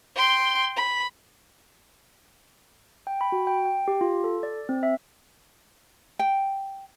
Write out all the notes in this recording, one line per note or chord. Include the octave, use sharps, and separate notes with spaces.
G5 C6
B5
G5
B5
F#4
G5
G5
G4
F4
A4
D5
C4
E5
G5